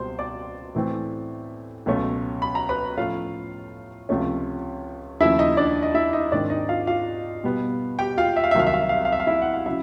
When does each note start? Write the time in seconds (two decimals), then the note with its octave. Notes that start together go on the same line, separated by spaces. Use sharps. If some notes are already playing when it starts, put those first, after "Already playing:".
Already playing: C#2 B2 G3 C4 C5 C6
0.19 D5 D6
0.75 A2 E3 A3 C4
1.86 C#2 B2 F#3 A3 C#4
2.42 B5
2.55 A#5
2.69 B4 B5
2.98 A2 F3 A3 C#4 F4 F5
4.09 C#2 C3 F3 A3 C#4
5.20 D#2 C#3 F3 A3 E4 E5
5.39 D#4 D#5
5.57 D4 D5
5.83 D#5
5.94 E4 E5
6.13 D#4 D#5
6.32 G#2 D#3 G#3 C4 D4 D5
6.50 D#4 D#5
6.69 F4 F5
6.87 F4 F5
7.44 B2 G3 B3
7.99 G4 G5
8.18 F4 F5
8.36 E5
8.44 F5
8.51 E5
8.55 C2 C3 D#3 F#3 F5
8.67 E5
8.74 F5
8.82 E5
8.89 F5
8.97 E5
9.05 F5
9.12 E5
9.20 F5
9.27 E4 E5
9.42 F#5
9.54 F5
9.66 C#3 F#3 E4 E5